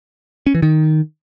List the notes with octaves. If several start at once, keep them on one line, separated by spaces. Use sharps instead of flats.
C#4
E3
D#3